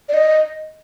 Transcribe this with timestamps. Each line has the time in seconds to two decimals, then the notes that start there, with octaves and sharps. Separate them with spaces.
0.09 D5
0.14 D#5